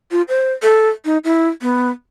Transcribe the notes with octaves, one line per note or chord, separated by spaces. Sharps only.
F4
C5
A4
D#4
E4
B3